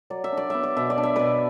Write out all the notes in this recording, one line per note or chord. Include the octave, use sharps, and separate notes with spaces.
F#3 D5
E5
D4
D5
B3 E5
D5
B2 E5
D5
D4
E5
B2 B4 D5